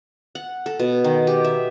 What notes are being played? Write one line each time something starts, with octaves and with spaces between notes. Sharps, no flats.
F#5
A4
B2
D#3
G4
E5